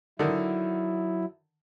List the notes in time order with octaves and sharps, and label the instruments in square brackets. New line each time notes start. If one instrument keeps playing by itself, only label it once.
[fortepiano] D3 D#3 [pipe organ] F#3 E4